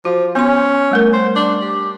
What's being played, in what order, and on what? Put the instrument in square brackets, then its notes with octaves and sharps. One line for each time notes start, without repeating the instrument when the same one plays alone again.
[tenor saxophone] F3 [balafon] F#4
[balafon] B3 C6 [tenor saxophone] C#4
[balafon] G3 A3 A#4
[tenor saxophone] C5
D4
G4